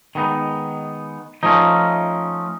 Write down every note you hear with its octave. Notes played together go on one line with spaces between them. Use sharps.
D#3 G#3 B3 D#4
F3 A3 C#4 D#4